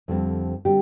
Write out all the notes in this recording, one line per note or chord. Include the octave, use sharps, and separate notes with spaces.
F2 D3 G3 C4
D3 G3 C4 G4